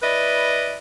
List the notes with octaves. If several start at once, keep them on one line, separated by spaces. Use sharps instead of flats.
E4 B4 D5 D#5